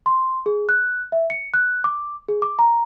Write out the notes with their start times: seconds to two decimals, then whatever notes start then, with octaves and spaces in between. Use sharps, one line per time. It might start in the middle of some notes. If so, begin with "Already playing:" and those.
0.06 C6
0.46 G#4
0.69 F#6
1.12 E5
1.30 C#7
1.54 F#6
1.84 D6
2.29 G#4
2.42 D6
2.59 A#5